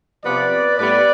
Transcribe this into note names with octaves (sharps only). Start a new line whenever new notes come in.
C3 F3 B3 B4 D5
A2 G3 B3 B4 D5